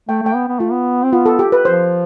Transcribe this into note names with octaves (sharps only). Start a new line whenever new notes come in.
A3 G5
A3 G5
B3
B3
A3 F4
B3
C4
B3 F4
A4
G4
B4
F3 C5